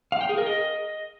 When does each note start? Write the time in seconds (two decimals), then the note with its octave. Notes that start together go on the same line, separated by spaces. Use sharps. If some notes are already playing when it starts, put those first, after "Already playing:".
0.12 F5
0.21 G5
0.29 G#4
0.38 A#4
0.46 D#5